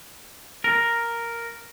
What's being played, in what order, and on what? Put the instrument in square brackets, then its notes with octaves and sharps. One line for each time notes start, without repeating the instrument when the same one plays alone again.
[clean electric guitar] A#4